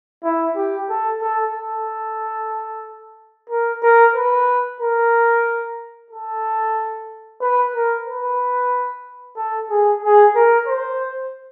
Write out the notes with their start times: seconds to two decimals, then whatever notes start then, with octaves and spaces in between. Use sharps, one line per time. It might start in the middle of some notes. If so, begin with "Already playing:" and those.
0.24 E4
0.56 G4
0.89 A4
1.22 A4
1.54 A4
3.50 A#4
3.82 A#4
4.15 B4
4.81 A#4
6.11 A4
7.41 B4
7.74 A#4
8.07 B4
9.37 A4
9.70 G#4
10.03 G#4
10.35 A#4
10.67 C5